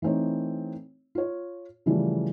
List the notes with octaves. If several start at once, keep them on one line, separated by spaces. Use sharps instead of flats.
E3 A3 C4 D#4 C#5
F4 C#5
C#3 E3 F3 G3 A3